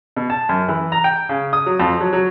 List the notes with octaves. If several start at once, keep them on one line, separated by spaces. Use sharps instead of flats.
B2
A5
F#2
E3
A#5
G5
C#3
D#6
F#3
F2
F#3
F#3